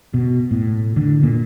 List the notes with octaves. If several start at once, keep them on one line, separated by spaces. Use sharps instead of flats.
B2
A2
D3
A#2